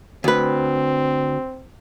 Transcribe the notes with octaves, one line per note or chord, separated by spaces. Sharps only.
D2 C4 B4